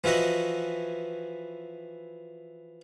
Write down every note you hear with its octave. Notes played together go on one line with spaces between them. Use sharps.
E3 F3 E4 F#4 D#5